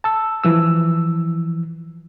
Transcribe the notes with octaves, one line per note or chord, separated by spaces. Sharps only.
A5 E6
E3 F3 E6